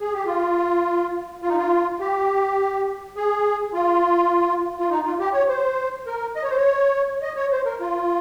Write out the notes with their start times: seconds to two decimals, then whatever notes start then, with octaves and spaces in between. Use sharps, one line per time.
0.01 G#4
0.13 G4
0.26 F4
1.42 F4
1.49 D#4
1.57 F4
2.00 G4
3.16 G#4
3.73 F4
4.79 F4
4.90 D#4
5.04 F4
5.20 G4
5.33 C#5
5.48 C5
6.06 A#4
6.36 D#5
6.43 C#5
6.50 C5
6.57 C#5
7.22 D#5
7.36 C#5
7.51 C5
7.65 A#4
7.80 F4